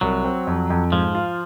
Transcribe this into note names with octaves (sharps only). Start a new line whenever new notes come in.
C2 F#3
C4
F2
F2
G#2 F3
F4